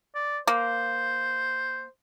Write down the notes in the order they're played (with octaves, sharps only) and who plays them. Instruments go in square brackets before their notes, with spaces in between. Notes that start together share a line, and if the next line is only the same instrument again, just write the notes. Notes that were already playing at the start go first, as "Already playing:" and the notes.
[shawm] D5
[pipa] A#3 [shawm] C5